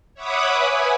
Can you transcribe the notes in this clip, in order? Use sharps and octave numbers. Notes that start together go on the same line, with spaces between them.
C#5 E5 F#5 B5 D6 D#6
B4 G#5